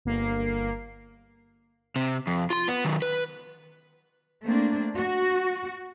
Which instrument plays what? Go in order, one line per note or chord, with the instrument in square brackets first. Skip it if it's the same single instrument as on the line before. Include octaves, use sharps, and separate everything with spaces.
[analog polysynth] G1 A#3 C7
[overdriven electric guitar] C3
F2
F4 C6
B3
D#3 F#3
B4
[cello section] A3 A#3 C4 D4
F#4